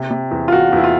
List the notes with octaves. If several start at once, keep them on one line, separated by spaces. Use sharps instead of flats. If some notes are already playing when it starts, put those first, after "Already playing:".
Already playing: C3
C3
E2
F4
E2 F#4
E2 E4
F4